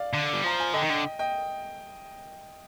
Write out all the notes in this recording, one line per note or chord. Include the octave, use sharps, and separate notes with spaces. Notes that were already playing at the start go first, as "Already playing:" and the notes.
Already playing: D5 F5
D3
G3
F3 A#5
G#5
D3 D#5 G5
D#3
D3
D#5 G5